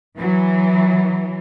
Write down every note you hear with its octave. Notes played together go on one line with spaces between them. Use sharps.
E3 F#3